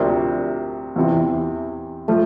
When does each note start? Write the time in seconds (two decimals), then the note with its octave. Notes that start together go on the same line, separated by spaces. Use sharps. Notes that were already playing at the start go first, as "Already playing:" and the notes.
Already playing: D2 C3 F3 A#3 D4
0.96 E2 C3 E3
2.08 F3 A3